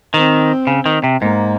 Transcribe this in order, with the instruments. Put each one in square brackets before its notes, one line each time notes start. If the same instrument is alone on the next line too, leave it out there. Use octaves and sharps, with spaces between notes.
[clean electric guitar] D#3 [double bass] C4
[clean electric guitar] C#3
D#3
C3
[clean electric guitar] G#2 [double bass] A#3